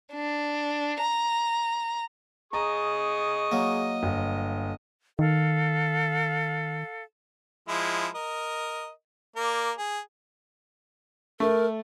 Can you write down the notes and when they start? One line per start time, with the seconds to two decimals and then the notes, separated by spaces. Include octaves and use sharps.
0.13 D4
1.01 A#5
2.53 G#4 D#5 A#5 C#6
3.52 F#3 A#3
4.03 G1
5.19 D#3 A4 F5
7.68 F3 G#3 E4
8.15 A#4 D#5
9.36 A#3 A#4 D5
9.78 G#4
11.40 A3 A#4